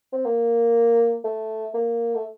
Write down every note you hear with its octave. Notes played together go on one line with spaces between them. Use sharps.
C4
A#3
A3
A#3
A3